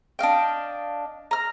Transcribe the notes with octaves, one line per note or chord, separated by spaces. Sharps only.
D4 D#5 F5 G5
A#5 F6